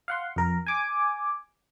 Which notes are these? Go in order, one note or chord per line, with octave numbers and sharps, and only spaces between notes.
F5 F#5 C6
F2 A#4
G#5 D6